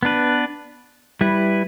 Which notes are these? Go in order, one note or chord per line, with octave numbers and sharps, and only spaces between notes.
B3 D4 B4
G3 E4 B4